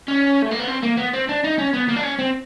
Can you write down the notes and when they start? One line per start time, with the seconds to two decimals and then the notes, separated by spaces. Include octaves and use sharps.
0.08 C#4
0.42 A3
0.51 A#3
0.60 B3
0.68 C4
0.83 A#3
0.98 B3
1.14 C4
1.29 D4
1.44 D#4
1.58 C#4
1.73 B3
1.88 A#3
1.96 D4
2.03 C#4
2.19 C4